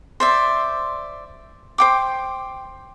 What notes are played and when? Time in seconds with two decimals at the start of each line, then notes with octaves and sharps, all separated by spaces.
0.20 C5 D5 E5
1.78 C5 G5 D6